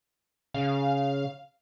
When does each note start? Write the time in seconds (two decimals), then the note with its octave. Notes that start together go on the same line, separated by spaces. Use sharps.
0.54 C#3 F5